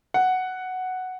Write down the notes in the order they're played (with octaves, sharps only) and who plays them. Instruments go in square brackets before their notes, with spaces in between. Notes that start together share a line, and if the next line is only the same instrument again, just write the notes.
[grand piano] F#5